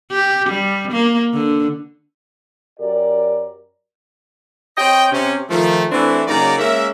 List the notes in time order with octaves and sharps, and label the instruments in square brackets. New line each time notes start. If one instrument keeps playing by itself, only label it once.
[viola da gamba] G4
G3
A#3
D3
[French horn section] F#2 G4 A#4 D5
[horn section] C4 C#5 D#5 G5
C3 C#4
D#3 F3 A3
E3 A3 C4 D4 E4 F#4
C#3 F#3 A#3 D#4 D5 A#5
G#3 A#3 C#4 A#4 E5